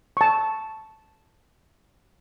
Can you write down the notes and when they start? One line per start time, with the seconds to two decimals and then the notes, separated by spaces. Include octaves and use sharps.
0.17 A5 C#6